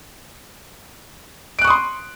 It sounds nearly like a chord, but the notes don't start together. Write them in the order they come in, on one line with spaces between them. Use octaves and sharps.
D7 F#6 C#6 D#6 C6